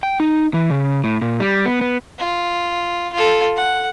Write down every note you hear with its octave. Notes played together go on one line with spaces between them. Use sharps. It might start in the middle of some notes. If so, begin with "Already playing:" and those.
G5
D#4
E3
C#3
A2
A#2
G3
B3
B3
F4
F4 A4
F#5